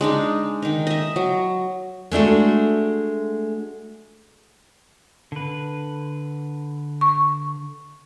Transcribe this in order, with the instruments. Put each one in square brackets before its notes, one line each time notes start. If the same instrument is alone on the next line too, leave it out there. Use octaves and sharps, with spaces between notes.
[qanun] G#3 D4 D#4
D#3 D#4
D#5 E5
F#3
[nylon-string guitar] G#3 A3 D4 F#4
[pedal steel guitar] D3 B4
[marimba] C#6